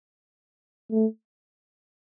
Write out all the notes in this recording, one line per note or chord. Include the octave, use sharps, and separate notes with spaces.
A3